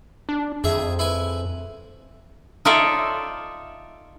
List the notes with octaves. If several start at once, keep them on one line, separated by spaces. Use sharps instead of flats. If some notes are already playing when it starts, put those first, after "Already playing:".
D4
F2 G#4 E5
E4 B4 G#5
D#4 F4 A4 C#5 D5 E5